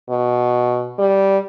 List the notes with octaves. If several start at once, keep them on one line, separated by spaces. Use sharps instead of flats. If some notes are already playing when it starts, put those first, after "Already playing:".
B2
G3